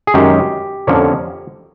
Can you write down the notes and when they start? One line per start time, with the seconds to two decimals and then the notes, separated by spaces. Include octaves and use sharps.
0.07 G#4
0.14 F#2 D#3 G#3 C#4 G4
0.87 F2 D3 F3 A#3 C#4